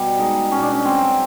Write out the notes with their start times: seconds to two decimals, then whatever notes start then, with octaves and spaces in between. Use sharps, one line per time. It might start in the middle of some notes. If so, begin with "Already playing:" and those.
Already playing: B2 G3
0.19 G#3 D#4
0.52 B2 C#4
0.62 D4
0.73 C#4
0.85 F#3 C4